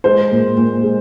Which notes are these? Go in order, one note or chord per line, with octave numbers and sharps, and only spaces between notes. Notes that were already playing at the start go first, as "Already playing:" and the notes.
G#3 C5
A#2
A#2
G#3